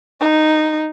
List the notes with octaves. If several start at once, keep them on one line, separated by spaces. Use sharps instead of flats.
D#4